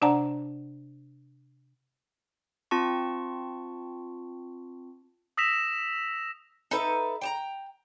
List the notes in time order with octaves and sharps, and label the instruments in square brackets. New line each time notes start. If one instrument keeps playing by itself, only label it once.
[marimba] C3 D4 D5 F#5 A5 A#5
[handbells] C4 F4 A5 C#6
[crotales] D#6 E6 A#6 B6 E7 F7
[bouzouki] D#4 A4 B4 E5
G5 A5 A#5